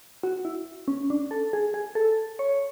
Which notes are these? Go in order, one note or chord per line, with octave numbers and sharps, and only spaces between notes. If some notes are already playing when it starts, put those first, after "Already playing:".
F#4
E4
C#4
D4
A4
G#4
G#4
A4
C#5